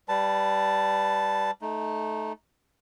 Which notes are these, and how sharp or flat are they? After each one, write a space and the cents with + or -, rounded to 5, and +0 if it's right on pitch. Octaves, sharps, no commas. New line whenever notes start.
G3 +0 B4 +15 A5 +0
A3 -15 D#4 +0